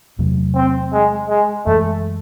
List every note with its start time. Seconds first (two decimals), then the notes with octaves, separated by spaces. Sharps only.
0.18 E2 C3 F#3 A3
0.55 C4
0.93 G#3
1.29 G#3
1.66 F#2 E3 G#3 A3